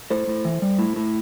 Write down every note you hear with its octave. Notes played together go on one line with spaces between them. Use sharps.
A2 A4 C5
A2
E3
G3
A2
A2